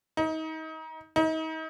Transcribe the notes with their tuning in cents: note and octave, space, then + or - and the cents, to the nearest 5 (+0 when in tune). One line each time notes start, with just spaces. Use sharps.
D#4 +30
D#4 +35